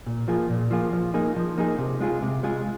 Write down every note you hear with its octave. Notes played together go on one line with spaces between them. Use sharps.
A#2
F3 A#3 F4 G#4
A#2
F3 A#3 F4 G#4
F3
A#3 D#4 G#4
F3
A#3 D#4 G#4
C3
G#3 F4 G#4
C3
G#3 F4 G#4